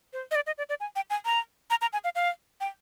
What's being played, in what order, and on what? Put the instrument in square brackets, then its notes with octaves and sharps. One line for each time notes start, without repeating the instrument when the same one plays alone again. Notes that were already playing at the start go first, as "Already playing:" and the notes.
[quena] C5
D#5
D5
D#5
D5
D5
G#5
G5
G#5
A#5
A#5
A#5
G#5
F5
F5
G5